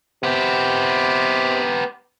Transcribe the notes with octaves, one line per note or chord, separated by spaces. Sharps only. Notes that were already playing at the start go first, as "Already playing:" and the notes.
C3 B3 G4